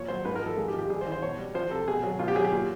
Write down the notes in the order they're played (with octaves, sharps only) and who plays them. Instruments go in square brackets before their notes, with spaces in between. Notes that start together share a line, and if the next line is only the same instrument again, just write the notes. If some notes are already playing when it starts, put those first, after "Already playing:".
Already playing: [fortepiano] A#2 F3 C#5
F#3 C5
G#2 B4
A#4
F3 A4
G#2 G#4
G4
F3
G4
G3 G#4
C5
E3
C5
B2 C#5
G3
F3 C5
C3 A4
B2 G#4
F#3
B2 F4
G4
F#3 G#4
G4
A#2